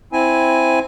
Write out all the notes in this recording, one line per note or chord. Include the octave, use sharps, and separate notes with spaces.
C4 E4 G#5